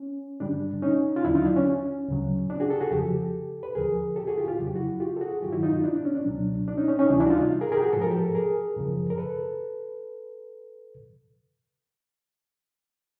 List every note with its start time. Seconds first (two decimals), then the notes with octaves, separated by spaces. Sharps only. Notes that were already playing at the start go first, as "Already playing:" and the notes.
Already playing: C#4
0.40 G2 D3 G3 D4
0.82 C#4 D#4
1.16 F4
1.24 D#2 D3 F#3 D4 E4
1.35 D#4 F4
1.45 D4 E4
1.56 C#4
2.08 D2 C#3 F#3
2.50 D4
2.60 F#4 G#4
2.70 G4 A4
2.80 F#4 G#4
2.91 F2 C#3 F3 G4 A4
3.63 B4
3.75 D#2 D3 F3 G#4 A#4
4.16 G4 A4
4.27 F#4 G#4
4.38 F4 G4
4.48 F4 G4
4.58 F2 C#3 F#3 F#4
4.67 G4
4.76 E4 F#4
5.00 F4 G4
5.17 A4
5.21 F#4 G#4
5.42 G2 D#3 F#3 F4 G4
5.52 E4 F#4
5.63 D#4 F4
5.73 D#4 F4
5.84 D4 E4
5.94 D4
6.05 C#4
6.15 D4
6.25 C#2 B2 F#3
6.68 D4
6.77 C#4 D#4
6.88 C#4
6.99 C#4 D#4
7.09 D2 C3 E3 G3 D4 E4
7.20 D4 E4
7.26 F#4
7.30 D#4 F4
7.41 D#4 F4
7.61 G#4 A#4
7.72 G#4 A#4
7.77 G4
7.82 F#4 G#4
7.93 G#2 F3 A4
8.02 A#4
8.11 G4 A4
8.35 G#4 A#4
8.76 F#2 C#3 F3
9.10 A#4
9.18 A4 B4